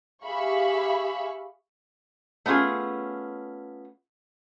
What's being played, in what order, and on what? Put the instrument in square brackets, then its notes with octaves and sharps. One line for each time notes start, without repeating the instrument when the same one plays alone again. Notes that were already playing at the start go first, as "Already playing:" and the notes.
[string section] G4 G#4 E5 F5 B5 C#6
[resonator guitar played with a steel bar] A3 B3 C#4 F4 G#4